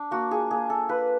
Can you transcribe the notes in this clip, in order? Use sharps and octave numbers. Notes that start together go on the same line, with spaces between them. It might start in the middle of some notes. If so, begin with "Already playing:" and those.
Already playing: D4
A#3 F#4
F4 G#4
A#3 G#4
A#3 A4
F4 B4